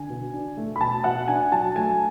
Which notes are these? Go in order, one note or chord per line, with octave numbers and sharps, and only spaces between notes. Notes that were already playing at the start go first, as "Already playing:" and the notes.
Already playing: D3 G#5
B2
D4
A3
B5
B2 A5
B2 F#5
D4 G#5
F#3 A5
A3 G#5